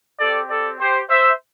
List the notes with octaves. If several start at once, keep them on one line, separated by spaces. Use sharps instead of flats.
C4 G4 A4 D5
A4 D5
G4 C5
C5 E5